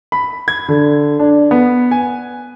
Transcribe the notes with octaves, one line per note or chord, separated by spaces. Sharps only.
B5
G#6
D3
D4
B3
G#5